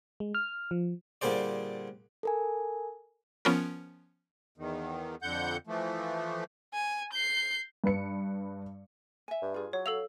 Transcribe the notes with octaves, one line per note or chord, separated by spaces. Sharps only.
G#3
F6
F3
A#2 D3 G3 G#4 C5 D5
A4 A#4 G#5
F3 B3 C#4 F4 A#4
E2 D#3
F2 D3 F#5 G6
E3 F3 A3
G#5
G6 C7
G2 B4 C#7
E5 G#5
G2
F4 G#4
F#3 C#5
A4 F5 E6 F7